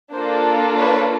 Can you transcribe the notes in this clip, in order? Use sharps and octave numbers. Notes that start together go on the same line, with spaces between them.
A#3 D4 F4 A4 C5
B4 C#5